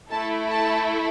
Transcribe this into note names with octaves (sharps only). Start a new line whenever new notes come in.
A3 E4 A4 A5
A5